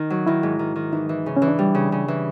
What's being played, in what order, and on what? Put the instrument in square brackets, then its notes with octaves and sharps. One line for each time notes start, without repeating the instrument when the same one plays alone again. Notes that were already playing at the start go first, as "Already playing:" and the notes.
Already playing: [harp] D#3 [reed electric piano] D#4
[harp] F#3
[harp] D#3 [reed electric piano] E4
[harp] G#2
D#3
D#3
[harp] E3 [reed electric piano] D#4
[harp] E3
C#3
[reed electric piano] C#4
[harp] E3
[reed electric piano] D4
[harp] G3
C#3
C#3
E3